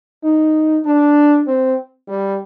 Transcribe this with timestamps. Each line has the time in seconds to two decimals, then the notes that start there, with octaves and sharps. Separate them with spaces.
0.23 D#4
0.85 D4
1.47 C4
2.08 G3